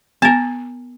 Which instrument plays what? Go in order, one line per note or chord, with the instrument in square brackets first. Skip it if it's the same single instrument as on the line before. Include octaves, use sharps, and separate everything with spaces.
[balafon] B3 [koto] A#4 A5